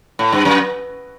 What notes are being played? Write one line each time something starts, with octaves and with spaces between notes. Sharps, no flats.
A2
G2
F#2